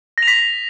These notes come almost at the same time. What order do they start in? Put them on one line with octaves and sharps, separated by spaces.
A#6 F7 B6